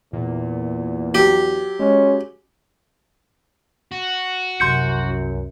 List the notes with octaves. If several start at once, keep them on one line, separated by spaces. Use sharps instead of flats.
E2 A#2
F#3 G4
G#3 C#4
F#4
C2 F#2 C6 G6 C#7